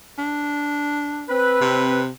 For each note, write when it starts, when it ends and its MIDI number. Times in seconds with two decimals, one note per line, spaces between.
0.18 1.31 62
1.29 2.01 60
1.29 2.01 71
1.61 2.09 48